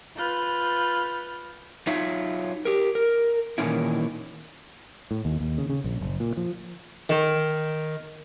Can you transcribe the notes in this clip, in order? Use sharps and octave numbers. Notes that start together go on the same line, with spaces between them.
F4 B4 F6 G6
F#3 D#4 F4 C#5 E5
G4 A#4
A#4
A#2 D#3 E3 A#3 C#4 E4
A2
D#2
D#2
C#3
C#3
A#1
F#1
A#2
F3
D#3